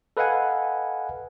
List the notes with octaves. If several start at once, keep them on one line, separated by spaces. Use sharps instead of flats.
A4 B4 D#5 F5 F#5 G#5